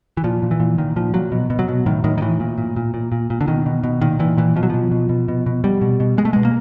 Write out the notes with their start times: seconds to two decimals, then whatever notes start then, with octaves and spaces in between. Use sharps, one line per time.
0.17 E3
0.24 A#2 F3
0.43 A#2
0.51 E3
0.60 A#2
0.78 A#2 D#3
0.96 A#2 F3
1.14 A#2 F#3
1.32 B2
1.50 B2
1.59 F#3
1.68 B2
1.86 A2 D#3
2.04 A2 D#3
2.18 D#3
2.21 A2 E3
2.40 A#2
2.58 A#2
2.77 A#2
2.94 A#2
3.12 A#2
3.30 A#2
3.41 D3
3.48 B2 D#3
3.66 B2
3.83 B2
4.01 A#2 D#3
4.19 A#2 E3
4.37 A#2 E3
4.56 B2 F3
4.63 F#3
4.70 B2 F3
4.91 B2
5.09 B2
5.28 B2
5.46 B2
5.64 B2 G3
5.81 B2
6.00 B2
6.17 B2 G#3
6.25 A3
6.33 B2 G#3
6.45 A#3